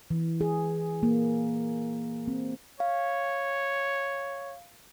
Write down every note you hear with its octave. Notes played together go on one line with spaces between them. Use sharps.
E3
G#4
A#3
C4
C#5 F5